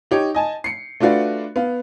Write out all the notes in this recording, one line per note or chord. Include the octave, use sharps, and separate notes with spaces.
D#4 G4 C#5
D#5 G#5 A5
C7 C#7
A3 D4 F4 F#4 B4 D5
B3 F5